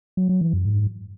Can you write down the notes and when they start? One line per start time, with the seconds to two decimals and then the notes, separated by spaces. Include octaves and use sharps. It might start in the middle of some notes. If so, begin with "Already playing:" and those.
0.17 F#3
0.29 F#3
0.41 E3
0.53 F#2
0.65 G#2